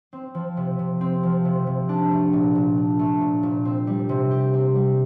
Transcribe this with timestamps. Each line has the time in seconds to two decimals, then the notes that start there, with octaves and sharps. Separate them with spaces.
0.13 C4
0.35 F3
0.57 C3
0.79 C3
1.01 C4
1.23 F3
1.45 C3
1.67 C3
1.89 D4
2.11 A3
2.33 A#2
2.55 A#2
2.77 D4
2.99 A3
3.21 A#2
3.43 A#2
3.65 C4
3.87 G3
4.09 C3
4.31 G4
4.53 C4
4.75 G3